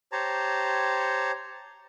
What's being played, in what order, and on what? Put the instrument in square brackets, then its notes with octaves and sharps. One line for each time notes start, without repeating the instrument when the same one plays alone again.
[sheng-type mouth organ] G4 C5 C#5 A5 A#5